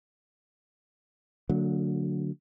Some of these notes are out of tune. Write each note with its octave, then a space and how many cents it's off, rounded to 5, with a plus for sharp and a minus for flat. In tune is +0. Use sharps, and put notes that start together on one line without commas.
D3 -15 F#3 -20 A3 +35